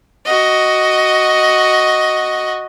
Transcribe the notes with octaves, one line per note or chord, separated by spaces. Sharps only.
F#4 D#5